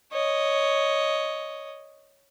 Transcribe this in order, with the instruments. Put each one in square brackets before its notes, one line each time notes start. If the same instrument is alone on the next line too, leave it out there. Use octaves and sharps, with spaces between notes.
[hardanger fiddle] C#5 D#5